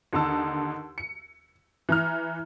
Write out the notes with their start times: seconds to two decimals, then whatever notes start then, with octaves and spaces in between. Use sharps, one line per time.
0.13 D#2 D3 D#4 A5 E6
0.98 C#7
1.89 E3 A#5 F6